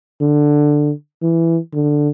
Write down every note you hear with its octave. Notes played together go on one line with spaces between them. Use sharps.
D3
E3
D3